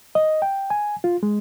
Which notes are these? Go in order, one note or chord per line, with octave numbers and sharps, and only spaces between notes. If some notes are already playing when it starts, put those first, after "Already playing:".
D#5
G5
G#5
F4
G#3